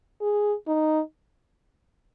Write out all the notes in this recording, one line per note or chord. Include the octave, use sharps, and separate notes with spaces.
G#4
D#4